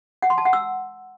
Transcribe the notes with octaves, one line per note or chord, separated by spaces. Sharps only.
F#5
C6
A5
F#5
E6